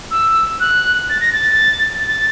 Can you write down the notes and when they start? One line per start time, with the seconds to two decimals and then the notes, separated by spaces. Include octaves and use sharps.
0.11 E6
0.60 F#6
1.10 A6
1.21 A#6
1.33 A6
2.07 A6